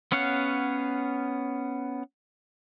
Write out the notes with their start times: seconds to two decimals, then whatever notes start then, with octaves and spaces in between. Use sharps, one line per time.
0.12 B3 C#4 C#5 F5 F#5